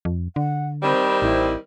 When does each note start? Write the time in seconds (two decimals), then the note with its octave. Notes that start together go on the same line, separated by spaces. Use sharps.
0.05 F2
0.36 D3 F#5
0.83 D#3 G3 C4 B5
1.22 A1 E4